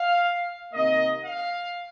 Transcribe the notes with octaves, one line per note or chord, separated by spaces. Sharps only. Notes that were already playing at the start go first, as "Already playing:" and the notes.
Already playing: F5
C3 D#3 A#3 D#5
F5